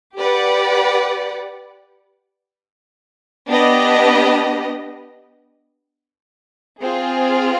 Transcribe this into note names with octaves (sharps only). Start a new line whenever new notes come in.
G4 B4 D5 F#5
B3 D4 G4 B4 D#5
C4 F4 G#4